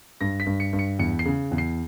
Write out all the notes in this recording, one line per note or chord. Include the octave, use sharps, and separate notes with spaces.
G2 A#6
B6
G2
C#7
G2
C#7
E2 C#7
C7
C#3
E2
C7